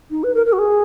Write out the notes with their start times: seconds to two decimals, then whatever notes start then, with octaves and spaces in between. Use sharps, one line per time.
0.11 D#4
0.24 B4
0.35 A#4
0.46 A#4
0.53 F#4
0.59 G#4